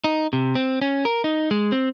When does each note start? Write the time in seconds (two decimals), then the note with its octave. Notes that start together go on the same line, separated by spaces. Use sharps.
0.04 D#4
0.33 C3
0.55 C4
0.82 C#4
1.05 A#4
1.24 D#4
1.51 G#3
1.72 C4